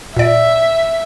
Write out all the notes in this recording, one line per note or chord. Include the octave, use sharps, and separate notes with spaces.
A#2 D5 E5